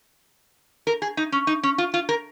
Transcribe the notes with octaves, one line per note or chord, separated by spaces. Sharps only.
A#4
G#4
D#4
C#4
D#4
C#4
F4
F4
A#4